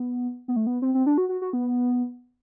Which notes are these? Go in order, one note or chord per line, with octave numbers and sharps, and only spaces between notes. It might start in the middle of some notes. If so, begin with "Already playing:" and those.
Already playing: B3
B3
A3
B3
C4
C4
D4
F#4
F#4
F#4
B3